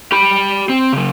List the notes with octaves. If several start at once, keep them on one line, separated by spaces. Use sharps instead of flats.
G4 B5
C4
C#3 F#3